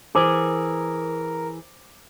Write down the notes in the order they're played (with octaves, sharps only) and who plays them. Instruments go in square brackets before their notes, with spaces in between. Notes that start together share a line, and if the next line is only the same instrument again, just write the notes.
[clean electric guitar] E3 G#4 [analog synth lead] A#4 [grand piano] C5 D6